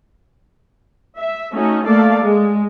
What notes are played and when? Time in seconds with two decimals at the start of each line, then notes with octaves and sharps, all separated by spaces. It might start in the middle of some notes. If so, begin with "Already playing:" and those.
1.18 E5
1.53 A3 C#4 D#4 F#4
1.86 A3 A#3 A4 D5 F5
2.23 G#3